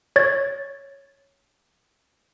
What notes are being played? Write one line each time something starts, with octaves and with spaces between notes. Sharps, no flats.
C#5 G#6 A6